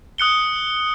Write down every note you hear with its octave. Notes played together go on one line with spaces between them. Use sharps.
D#6 F#6 C#7 G7